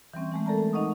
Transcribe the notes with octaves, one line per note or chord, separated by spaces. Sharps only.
E3 G3 C4 C#4
E3 G#3 A3
A4 A#4 D5 A5 A#5
D#4 D#5 F#5 C#6 D#6